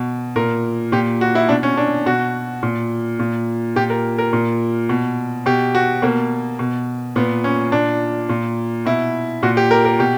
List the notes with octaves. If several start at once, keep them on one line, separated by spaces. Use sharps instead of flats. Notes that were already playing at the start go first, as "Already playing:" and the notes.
Already playing: B2
A#2 A#4
A#2 G4
F#4
E4
B2 D4
C#4
D4
B2 F#4
A#2
A#2
A#2 G4
A#4
A#4
A#2
B2
B2 G4
F#4
B2 A#3
B2
A#2 B3
C#4
A#2 D4
A#2
B2 E4
A#2 F#4
G4
A#4
A#4
B2 G4